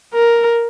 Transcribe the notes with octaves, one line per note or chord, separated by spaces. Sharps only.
A#4